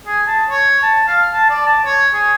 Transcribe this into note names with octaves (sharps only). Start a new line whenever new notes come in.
G#4
A5
C#5
A5
F5
A5
D5
A5
C#5
G#4